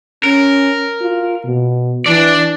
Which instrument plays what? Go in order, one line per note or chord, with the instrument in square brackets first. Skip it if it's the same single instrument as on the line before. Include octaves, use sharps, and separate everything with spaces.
[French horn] C#4 [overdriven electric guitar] A#4
[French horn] F4
B2
[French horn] E3 [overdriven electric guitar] D4 D5